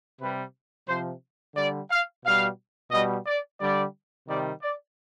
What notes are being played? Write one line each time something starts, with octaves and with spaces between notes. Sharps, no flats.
C3 G3 B4
C3 F3 C5
D3 G3 D5
F5
B2 G3 F5
B2 G3 D#5
D5
D3 G3 D5
C3 D#3 G3 D5
D5